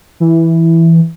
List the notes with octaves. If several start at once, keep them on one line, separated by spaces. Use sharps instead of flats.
E3